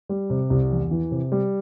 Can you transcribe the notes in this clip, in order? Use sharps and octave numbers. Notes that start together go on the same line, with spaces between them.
G3
C3
C2
E2
E3
C3
G3